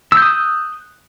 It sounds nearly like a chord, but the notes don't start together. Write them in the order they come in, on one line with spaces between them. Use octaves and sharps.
E6 G6 D#6 F#6